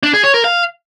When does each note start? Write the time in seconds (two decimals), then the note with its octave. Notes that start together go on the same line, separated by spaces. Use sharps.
0.03 D4
0.13 G#4
0.24 C#5
0.34 A#4
0.44 F5